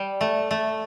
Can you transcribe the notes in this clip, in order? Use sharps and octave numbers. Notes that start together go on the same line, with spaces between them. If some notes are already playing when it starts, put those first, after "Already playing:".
Already playing: G3
A3
A3